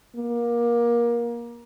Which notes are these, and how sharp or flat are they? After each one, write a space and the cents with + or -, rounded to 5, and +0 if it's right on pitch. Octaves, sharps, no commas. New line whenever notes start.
A#3 +25